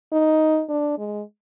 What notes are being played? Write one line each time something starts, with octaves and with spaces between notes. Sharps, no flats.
D#4
D4
G#3